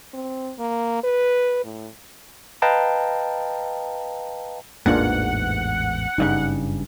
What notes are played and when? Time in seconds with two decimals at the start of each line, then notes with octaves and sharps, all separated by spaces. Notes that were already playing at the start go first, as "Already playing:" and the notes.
0.14 C4
0.59 A#3
1.04 B4
1.64 A2
2.62 B4 D#5 F5 G5 A5 A#5
4.86 A1 E2 G#2 A#3 D4 F4 F#5
6.18 F#1 G2 C#3 D#4